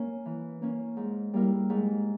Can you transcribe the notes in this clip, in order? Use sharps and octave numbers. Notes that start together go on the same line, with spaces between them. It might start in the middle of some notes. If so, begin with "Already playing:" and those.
Already playing: A#3 C#4
E3
A#3 C#4
G#2
G3 A#3 E4 A#4
G#2